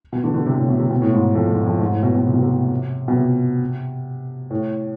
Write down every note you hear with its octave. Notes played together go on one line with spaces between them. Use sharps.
B2
D3
D3
C3
A2
B2
C3
B2
A2
G#2
F2
G#2
F2
G#2
A2
B2
B2
C3
B2
C3
B2
C3
A2